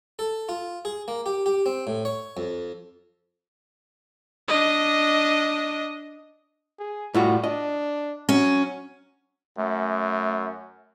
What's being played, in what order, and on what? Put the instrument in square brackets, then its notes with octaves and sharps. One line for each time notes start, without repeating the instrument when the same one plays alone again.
[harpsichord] A4
F4
G#4
A#3
G4
G4
C4
A2
C#5
F2
[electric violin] D4 D#5
[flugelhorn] G#4
[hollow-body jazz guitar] A2 F4 F#4 [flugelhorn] G3
[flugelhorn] D4 [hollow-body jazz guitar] D#5
[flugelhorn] F#3 [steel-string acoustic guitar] C#4
[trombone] F#2 [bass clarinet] A3